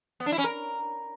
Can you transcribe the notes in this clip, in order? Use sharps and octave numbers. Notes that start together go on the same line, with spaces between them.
B3
D4
E4
C#4
A#4